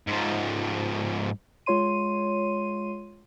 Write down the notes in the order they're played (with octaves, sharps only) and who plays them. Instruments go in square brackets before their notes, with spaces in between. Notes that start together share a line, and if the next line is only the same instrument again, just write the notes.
[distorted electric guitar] G#2 F3
[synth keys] G#3 F4 C#5 C6 D#7